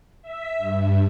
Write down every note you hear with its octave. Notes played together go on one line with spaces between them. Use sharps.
E5
G2